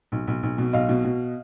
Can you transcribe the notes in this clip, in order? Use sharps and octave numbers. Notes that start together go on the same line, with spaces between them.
B1
B1
B1
B2
B1 D#5 F5
B2
B2